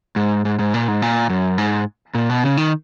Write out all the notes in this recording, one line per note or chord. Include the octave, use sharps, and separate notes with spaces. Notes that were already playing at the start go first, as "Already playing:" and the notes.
G#2
G#2
G#2
A#2
G#2
A#2
F#2
G#2
A#2
B2
C#3
D#3